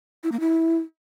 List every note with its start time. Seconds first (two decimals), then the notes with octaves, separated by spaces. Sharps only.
0.24 E4
0.32 A#3
0.40 E4